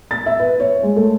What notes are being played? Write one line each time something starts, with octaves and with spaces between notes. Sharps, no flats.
A6
E5
B4
C#5
G#3
A3